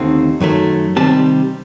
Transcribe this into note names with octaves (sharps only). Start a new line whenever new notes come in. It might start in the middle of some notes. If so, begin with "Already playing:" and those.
Already playing: D#2 D3 A3 C4 D#4
F#2 D#3 F#3 A3
C3 D#3 G3 C4 A5